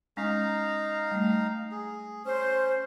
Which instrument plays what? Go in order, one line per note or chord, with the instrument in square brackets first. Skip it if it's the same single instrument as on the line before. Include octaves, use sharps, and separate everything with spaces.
[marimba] G#3 C#4 [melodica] D#4 F5 A#5
[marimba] G3 A3
[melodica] G#4
[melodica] C#4 [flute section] C5